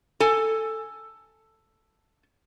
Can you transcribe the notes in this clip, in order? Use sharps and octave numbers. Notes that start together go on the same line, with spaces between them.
A4 G#5